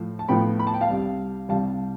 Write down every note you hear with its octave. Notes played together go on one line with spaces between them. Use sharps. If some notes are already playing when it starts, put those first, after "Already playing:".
Already playing: A2 F3
A5
A2 F3 B3 G5 B5
B5
A5
G5
F5 A5
C2 C3 G3
C2 C3 G3 F5 A5